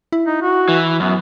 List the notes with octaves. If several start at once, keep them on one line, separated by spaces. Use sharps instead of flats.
E4
D#4
F#4
E3
F#2 B3